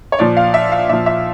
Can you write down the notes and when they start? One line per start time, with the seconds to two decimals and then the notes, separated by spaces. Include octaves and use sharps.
0.12 C#5
0.19 A#2 F3 D5
0.37 F5
0.54 E5
0.72 F5
0.89 A#2 F3 E5
1.06 E5